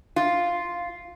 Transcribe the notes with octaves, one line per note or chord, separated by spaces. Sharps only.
F4